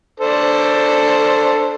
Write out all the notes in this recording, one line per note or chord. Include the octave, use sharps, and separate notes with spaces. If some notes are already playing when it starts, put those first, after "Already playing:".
D4 A4 C5